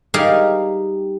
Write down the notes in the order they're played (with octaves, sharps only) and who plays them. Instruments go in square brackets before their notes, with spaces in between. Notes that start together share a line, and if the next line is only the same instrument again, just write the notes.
[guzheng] G3 D#4 G4 G#4 A#4 F5